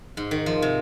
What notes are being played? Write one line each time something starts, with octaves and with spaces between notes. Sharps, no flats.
G#2
D#3
F3
C3